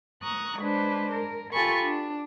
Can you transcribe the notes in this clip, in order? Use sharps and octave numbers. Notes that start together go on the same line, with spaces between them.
A#5 C#6 D#6 F#6
G#3 D4 B4 C5
A#4
F4 G4 A4 G#5 B5 C#6
D4